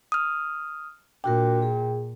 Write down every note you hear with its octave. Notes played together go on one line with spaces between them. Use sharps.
D#6 F6
A#2 D4 F#4 A#4 G5
G#4